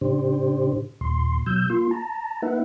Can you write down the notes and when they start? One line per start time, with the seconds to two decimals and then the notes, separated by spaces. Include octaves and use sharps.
0.01 A2 C#3 D4 G4 C5
1.01 D#2 A#2 C6
1.46 B2 F#3 E6 G6
1.70 A#3 F4 C6
1.91 A5 A#5
2.42 A#3 D#4 B4 E5 F#5